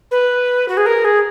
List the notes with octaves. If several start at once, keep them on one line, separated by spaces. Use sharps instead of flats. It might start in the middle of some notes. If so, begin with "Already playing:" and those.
B4
F#4
G#4
A#4
G#4